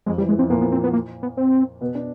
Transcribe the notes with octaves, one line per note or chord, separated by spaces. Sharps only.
F2 F3 G#3
E3 G3
E3 G#3
F2 F3 C4
A#2 A#3 B3
B3
C4
B3
A#3
B3
C4
B2 B3
D4